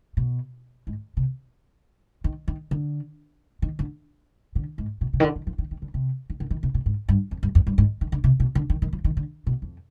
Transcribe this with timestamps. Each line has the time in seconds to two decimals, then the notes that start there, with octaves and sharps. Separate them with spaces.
0.17 B2
0.87 G#2
1.17 C3
2.24 D#3
2.48 D#3
2.71 D3
3.62 D#3
3.79 D3
4.55 D3
4.78 G#2
5.01 B2
5.13 C3
5.20 D#3
5.24 D3
5.36 D#3
5.47 F3
5.58 D#3
5.71 D#3
5.82 D3
5.94 C3
6.30 D#3
6.40 D3
6.51 D#3
6.63 C3
6.74 B2
6.86 G#2
7.08 G2
7.31 F2
7.43 G2
7.55 F2
7.67 G2
7.78 G#2
8.01 D#3
8.12 D3
8.24 C3
8.40 B2
8.55 D3
8.70 D#3
8.82 D#3
8.93 F3
9.04 D#3
9.17 D3
9.47 B2
9.62 F2